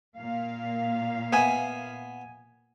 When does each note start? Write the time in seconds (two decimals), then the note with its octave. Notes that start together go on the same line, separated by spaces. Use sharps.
0.19 A#2 A#3 F5
1.33 B3 E5 G#5